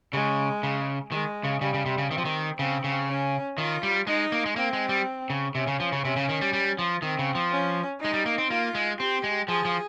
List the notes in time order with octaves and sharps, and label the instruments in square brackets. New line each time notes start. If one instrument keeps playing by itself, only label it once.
[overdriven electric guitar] C#3 [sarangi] G#3
[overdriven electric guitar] C#3
[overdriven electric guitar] D#3 [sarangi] G#3
[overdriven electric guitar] C#3
[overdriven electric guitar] C#3 [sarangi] G3
[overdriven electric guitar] C#3
C3
C#3
[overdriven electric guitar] D#3 [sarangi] C4
[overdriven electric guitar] F3
D#3
[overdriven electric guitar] C#3 [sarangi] C4
[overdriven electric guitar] C#3
[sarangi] C#4
[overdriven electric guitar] D#3 [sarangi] F4
[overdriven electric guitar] G3
[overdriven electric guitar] G#3 [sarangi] D#4
[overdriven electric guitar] A#3
G#3
[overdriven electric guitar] A#3 [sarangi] C4
[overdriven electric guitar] G#3
G3
C#3
[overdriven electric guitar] C3 [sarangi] C#4
[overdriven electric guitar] C#3
F3
C#3
[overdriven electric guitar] C3 [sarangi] C#4
[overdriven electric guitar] C#3
D#3
G3
G3
F3
[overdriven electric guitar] D#3 [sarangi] C4
[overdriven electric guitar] C#3
F3
[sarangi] C#4
[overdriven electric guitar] G#3 [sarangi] D#4
[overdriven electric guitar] G3
A#3
C4
[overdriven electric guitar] A#3 [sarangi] F4
[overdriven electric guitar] G#3
[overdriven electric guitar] C4 [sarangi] G4
[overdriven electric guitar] G#3
[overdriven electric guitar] F3 [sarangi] G#4
[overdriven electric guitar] F3